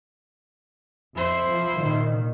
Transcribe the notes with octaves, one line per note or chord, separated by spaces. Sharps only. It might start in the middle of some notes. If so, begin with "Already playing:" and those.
F2 E4 C5
F3
A#2 D#3